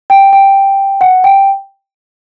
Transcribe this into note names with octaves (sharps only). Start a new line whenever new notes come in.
G5
G5
F#5
G5